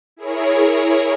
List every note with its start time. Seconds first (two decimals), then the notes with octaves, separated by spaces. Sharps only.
0.17 E4 G#4 A#4 C#5